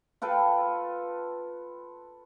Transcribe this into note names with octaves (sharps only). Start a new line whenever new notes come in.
F4 A4 B4 G5